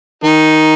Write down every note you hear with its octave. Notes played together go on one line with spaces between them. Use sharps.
D#3 D#4